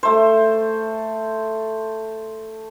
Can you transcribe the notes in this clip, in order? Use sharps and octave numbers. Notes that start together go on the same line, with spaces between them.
A3 C5